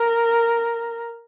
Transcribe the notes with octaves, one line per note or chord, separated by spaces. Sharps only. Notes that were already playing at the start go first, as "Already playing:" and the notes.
Already playing: A#4